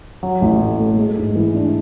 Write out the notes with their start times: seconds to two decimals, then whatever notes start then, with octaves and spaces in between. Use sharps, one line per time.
0.23 F#3
0.41 A1
0.60 A2
0.79 A3
0.97 G#3
1.17 G#2
1.35 E3
1.54 D4